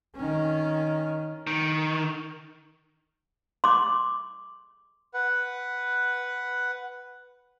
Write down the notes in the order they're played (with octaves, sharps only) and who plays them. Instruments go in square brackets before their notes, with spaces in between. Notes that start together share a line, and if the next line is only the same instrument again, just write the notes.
[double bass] D#3 C#4
[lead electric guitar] D#3
[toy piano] C6 D6
[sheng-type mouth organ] B4 F#5